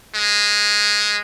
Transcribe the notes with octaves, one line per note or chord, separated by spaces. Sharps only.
G#3